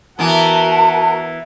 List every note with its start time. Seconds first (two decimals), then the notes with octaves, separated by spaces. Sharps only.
0.19 E3 B3 F#4 A#4 A5